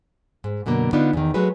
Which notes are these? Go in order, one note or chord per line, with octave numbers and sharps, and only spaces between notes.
G#2
F#2 B2 D3 A#3
D3 B3 D4 D#4 F4
E2 D#3
F#3 G#3 A3 F#4 B4